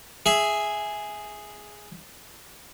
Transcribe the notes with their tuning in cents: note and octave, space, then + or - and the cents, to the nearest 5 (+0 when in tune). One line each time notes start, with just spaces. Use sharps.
G#4 +0 E5 +0